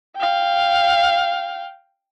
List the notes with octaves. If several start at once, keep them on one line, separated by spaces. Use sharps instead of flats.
F5 G5